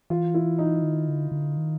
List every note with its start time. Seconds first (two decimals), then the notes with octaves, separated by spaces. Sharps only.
0.10 E3 F4
0.34 E4
0.58 D#4
0.83 D#3
1.08 D3
1.32 D3
1.57 D#3